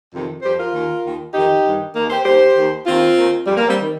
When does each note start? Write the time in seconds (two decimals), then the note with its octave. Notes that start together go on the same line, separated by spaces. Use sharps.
0.12 F2 C3 D#3
0.43 F2 F3 G4 C5
0.58 F4 A#4
0.73 D#2 D#3
1.03 D#2 D#3
1.34 F2 D#3 D#4 G4
1.65 G2 D#3
1.95 D#2 D#3 A#3
2.10 G4 C5
2.25 D#2 D#3 G4 C5
2.56 D#2 D#3
2.86 D#2 D#3 C4 F4
3.17 D#2 D#3
3.47 F2 F3 G3
3.57 A#3
3.67 G3 C4
3.81 D#3